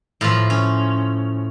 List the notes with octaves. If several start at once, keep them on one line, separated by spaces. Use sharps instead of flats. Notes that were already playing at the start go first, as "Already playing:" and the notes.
A2 F3 F4
C#4